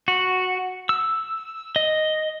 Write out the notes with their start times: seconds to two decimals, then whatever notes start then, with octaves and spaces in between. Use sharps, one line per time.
0.08 F#4
0.89 E6
1.76 D#5